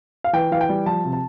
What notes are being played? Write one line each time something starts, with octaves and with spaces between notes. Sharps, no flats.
F5
E3 G5
E3 F5
G5
G3
F3 A5
C3
A5